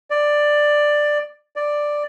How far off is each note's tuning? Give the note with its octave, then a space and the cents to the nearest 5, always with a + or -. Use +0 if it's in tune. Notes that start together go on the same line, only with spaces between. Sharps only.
D5 +10
D5 +5